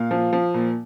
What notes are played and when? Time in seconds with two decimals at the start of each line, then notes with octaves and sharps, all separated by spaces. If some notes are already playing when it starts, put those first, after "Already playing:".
Already playing: A#2 F5
0.11 F3
0.33 F3
0.54 A#2